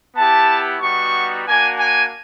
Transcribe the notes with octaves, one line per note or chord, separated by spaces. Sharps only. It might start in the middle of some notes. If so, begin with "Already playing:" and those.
B3 E4 G4 A5
G3 B3 D#4 F#4 C#6
A#3 D4 F#4 G#5
G#5